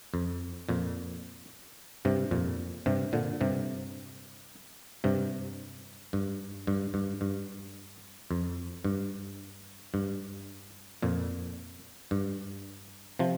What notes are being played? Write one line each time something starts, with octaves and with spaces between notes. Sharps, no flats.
F2
F2 A#2
G2 C3
F2 A#2
G2 C3
A#2 D3
G2 C3
G2 C3
G2
G2
G2
G2
F2
G2
G2
F2 A#2
G2
C3 F3